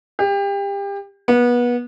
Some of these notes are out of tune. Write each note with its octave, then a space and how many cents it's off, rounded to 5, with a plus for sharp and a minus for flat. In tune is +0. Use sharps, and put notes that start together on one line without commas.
G4 +30
B3 -25